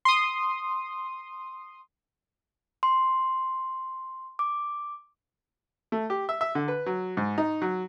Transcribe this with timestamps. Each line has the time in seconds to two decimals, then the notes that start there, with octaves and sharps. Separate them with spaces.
0.05 C6 D#6
2.83 C6
4.39 D6
5.92 A3
6.10 G4
6.29 E5
6.41 E5
6.55 D3
6.68 B4
6.86 F#3
7.17 G#2
7.38 D#4
7.62 F#3